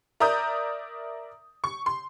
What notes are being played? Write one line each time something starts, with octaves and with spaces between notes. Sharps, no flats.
A#4 D5 E5 A#5 D#6 G6
C#6
C6